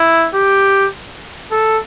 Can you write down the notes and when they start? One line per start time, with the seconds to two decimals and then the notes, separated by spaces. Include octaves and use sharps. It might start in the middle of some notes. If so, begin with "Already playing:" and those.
Already playing: E4
0.34 G4
1.52 A4